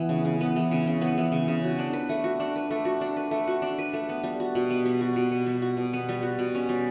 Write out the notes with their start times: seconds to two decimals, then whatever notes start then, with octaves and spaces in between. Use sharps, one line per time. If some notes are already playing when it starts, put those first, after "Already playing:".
Already playing: E3 B3
0.09 C#3
0.25 C#3
0.41 B3
0.56 E3
0.71 C#3
0.87 C#3
1.02 B3
1.18 E3
1.32 C#3
1.48 C#3
1.63 F#4
1.79 D4
1.93 B4
2.09 A3
2.24 F#4
2.40 D4
2.56 B4
2.71 A3
2.85 F#4
3.01 D4
3.16 B4
3.31 A3
3.47 F#4
3.62 D4
3.78 B4
3.93 A3
4.09 B3
4.23 G3
4.40 F#4
4.55 B2
4.70 B3
4.85 G3
5.01 F#4
5.16 B2
5.32 B3
5.46 G3
5.62 F#4
5.77 B2
5.93 B3
6.09 G3
6.23 F#4
6.39 B2
6.55 C#4
6.69 G3